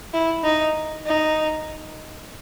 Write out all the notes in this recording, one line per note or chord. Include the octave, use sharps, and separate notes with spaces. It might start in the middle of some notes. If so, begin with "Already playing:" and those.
E4
D#4
D#4